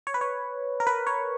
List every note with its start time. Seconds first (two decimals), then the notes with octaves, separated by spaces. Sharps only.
0.07 C#5
0.14 B4
0.21 C#5
0.80 A#4
0.87 B4
1.07 C#5